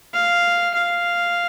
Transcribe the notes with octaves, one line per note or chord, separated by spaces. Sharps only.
F5
F5